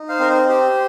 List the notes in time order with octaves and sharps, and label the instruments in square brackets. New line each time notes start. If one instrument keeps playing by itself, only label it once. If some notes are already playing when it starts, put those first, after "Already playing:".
Already playing: [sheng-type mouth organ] D#4
C5 F5
C4 A#4
C5
G4 C5